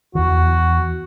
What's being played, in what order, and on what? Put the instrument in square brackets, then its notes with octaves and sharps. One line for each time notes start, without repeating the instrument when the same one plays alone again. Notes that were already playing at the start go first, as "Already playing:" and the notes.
[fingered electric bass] E2 E3 [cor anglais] F#4